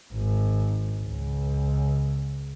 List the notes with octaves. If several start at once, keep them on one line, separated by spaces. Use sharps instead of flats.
G#1
C#2